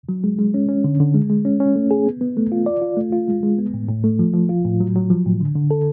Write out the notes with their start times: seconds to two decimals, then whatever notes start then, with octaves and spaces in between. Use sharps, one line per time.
0.09 F#3
0.24 G#3
0.39 G#3
0.54 C#4
0.68 C#4
0.84 D3
1.00 D3
1.14 G#3
1.30 G#3
1.45 C#4
1.60 C#4
1.76 A3
1.91 G#4
2.06 B3
2.21 B3
2.37 A3
2.52 F4
2.66 D5
2.81 F4
2.97 A3
3.13 F4
3.28 G#3
3.43 G#3
3.58 B3
3.74 A2
3.89 A2
4.04 A3
4.19 F3
4.34 F3
4.49 F4
4.65 A2
4.80 F#3
4.96 F#3
5.10 F3
5.25 A2
5.40 D3
5.55 D3
5.71 A4